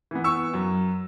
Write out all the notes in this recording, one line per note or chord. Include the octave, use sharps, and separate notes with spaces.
E3 B3
C#6 E6
F#2